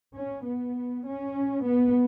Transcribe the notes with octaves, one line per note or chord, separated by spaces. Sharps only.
C#4
B3
C#4
B3